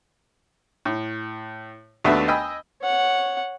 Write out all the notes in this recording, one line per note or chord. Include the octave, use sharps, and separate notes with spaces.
A2
D#2 A3 B3 D4 F#4 E5
D#5 G5 G#5 B5 E6
C#5 F#5